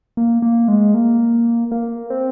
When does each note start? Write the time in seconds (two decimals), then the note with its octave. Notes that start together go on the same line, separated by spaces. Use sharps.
0.17 A#3
0.42 A#3
0.68 G#3
0.94 A#3
1.71 A#3
2.10 C4